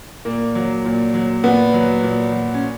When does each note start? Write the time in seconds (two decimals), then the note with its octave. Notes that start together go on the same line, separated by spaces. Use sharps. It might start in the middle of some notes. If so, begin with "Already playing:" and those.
0.25 A#2 A#3
0.55 F#3
0.85 A#2
1.14 F#3
1.44 A#2 B3
1.73 F#3
2.03 A#2
2.32 F#3
2.54 C#4